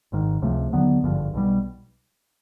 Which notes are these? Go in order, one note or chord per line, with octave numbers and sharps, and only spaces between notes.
G#1 G#2 D#3
C#2 C3 F3 A3
D#2 D3 F#3 B3
G#1 G2 D3 F3
B1 B2 G3